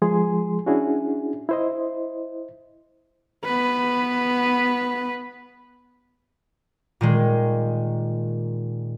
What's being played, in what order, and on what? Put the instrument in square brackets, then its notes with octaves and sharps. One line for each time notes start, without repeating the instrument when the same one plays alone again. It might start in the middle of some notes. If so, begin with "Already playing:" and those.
[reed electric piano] F3 G#3 G#4 C6
C#4 D4 E4 F#4 G#4
E4 C5 D#5
[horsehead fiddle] B3 B4
[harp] A#2 D#3 G#3